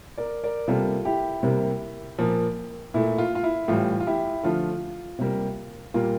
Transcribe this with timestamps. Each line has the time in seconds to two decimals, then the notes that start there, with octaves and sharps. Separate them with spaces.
0.18 A#4 D5
0.44 A#4 D5
0.68 C3 G3 A#3 F4 A4
1.05 E4 G4
1.43 C3 G3 A#3
2.19 A#2 F3 A#3
2.94 A#2 A3 E4
3.18 F4
3.35 F4
3.43 E4
3.68 A2 E3 G3 F4
4.00 F4
4.07 E4 G4
4.43 D3 F3 A3 F4
5.19 C3 G3 A#3
5.94 A#2 G3 A#3 F4